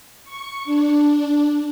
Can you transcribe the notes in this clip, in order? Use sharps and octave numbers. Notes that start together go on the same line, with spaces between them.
C#6
D4